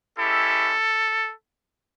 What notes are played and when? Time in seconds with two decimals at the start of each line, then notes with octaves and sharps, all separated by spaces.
0.18 G#3 C#4 E4 G4 A4